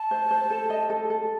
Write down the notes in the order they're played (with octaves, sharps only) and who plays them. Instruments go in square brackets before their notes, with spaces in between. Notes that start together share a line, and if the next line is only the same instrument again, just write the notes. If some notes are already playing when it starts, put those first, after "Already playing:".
Already playing: [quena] A5
[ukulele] C5
C5
A4
D#5
A4
A4